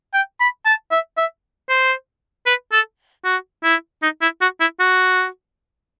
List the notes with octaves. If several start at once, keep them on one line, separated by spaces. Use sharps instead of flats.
G5
B5
A5
E5
E5
C5
B4
A4
F#4
E4
D#4
E4
F#4
E4
F#4